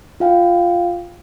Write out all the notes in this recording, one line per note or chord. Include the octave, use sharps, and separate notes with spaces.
F4 F5 G5